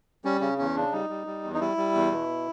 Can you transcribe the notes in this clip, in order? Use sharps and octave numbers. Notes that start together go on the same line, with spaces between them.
G3 C#4
C#3 C#4
E2 C#4
C#3 D4
G3 D#4
G3
G3
E2
D#4
G3 E4
G3
E2
B2